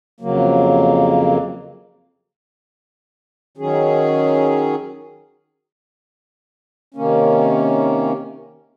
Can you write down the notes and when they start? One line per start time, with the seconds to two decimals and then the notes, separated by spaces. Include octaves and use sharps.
0.21 F2 C#3 F#3 A#3
3.58 D#3 F#3 C#4 G#4
6.94 C3 D#3 A#3 C#4